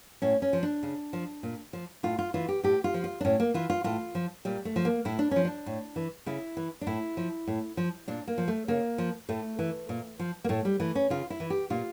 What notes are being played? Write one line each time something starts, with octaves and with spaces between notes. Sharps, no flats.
A2 C#4
C#4
F3
D4
C#3
F3
A#2
F3
A2 F4
F4
E3 F4
G4
A2 G4
F4
F3
F4
D4
A2 C#4
A#3
E3 F4
F4
A2 F4
F3
A#2 G3
A3
F3
A#3
A2 E4
D4
F3 C#4
D4
A2
E3
C#3 E4
E3
D4
A2 E4
F3
A2
F3
A#2 D4
A#3
F3
A3
C#3 A#3
F3
A2 A3
E3
A#2
F3
A#3
A2 A3
G3
E3 A3
C#4
C#3 F4
E4
E3
G4
A#2 F4